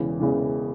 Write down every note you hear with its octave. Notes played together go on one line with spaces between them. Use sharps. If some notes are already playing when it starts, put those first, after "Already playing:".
Already playing: E1 E2 C#3 E3
E1 E2 C#3 E3